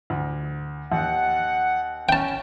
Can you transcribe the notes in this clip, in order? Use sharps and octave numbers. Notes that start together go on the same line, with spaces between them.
D2
D#2 F#5
C#4 G5 A5